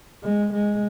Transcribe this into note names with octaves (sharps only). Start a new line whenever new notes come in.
G#3
G#3